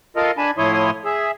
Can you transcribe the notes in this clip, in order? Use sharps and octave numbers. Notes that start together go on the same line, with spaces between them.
F4 A4 A#4 D#5 F5
D4 G#5 A5 B5
A2 F3 E4 C#5 C6 D#6
G#4 E5